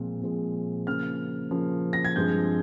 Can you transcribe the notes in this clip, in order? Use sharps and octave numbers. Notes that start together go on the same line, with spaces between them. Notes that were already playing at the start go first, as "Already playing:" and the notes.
Already playing: A#2 F3 G#3 C4
A#2 F3 G#3 C4
C#3 F3 A#3 F6
C#3 F3 A#3
A#6
G#6
G2 F3 G#3 C4 G6